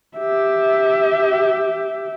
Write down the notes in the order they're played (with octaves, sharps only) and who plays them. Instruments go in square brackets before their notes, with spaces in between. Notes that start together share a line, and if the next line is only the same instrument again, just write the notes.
[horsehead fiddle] G4 E5